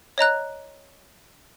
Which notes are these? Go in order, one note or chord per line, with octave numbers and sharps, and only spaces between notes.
C#5 D#5 A#5 F#6